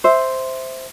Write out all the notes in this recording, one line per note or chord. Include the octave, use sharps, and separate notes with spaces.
C5 E5